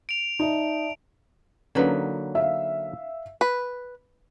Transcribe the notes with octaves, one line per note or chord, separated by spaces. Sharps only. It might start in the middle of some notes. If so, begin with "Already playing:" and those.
D7 F7
D#4 D5 E5 A5
D3 F#3 A#3 C#4 D#4 B4
E5 F5
B4